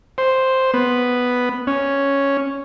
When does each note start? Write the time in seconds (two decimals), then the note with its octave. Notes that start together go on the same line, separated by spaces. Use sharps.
0.18 C5
0.74 B3
1.67 C#4